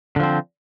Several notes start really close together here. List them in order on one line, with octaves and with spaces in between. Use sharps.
D3 F3 C4